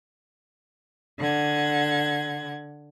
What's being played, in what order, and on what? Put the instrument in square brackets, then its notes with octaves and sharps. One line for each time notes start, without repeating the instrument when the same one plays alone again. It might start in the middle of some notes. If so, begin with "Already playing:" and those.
[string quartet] D3 F#5 G#6